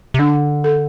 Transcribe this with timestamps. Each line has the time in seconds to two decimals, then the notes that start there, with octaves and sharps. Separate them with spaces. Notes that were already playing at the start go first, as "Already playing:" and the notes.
0.14 C3
0.19 D3 D4
0.64 A4